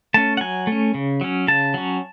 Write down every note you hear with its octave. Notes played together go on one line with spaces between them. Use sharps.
A3 C#4 A5
F#5
F#3 G#5
A3 C#4
C#3
F#3 C#4
C#3 A5
F#3 C#4